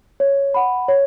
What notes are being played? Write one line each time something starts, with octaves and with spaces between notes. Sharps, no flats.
C#5
F#5 B5
C#5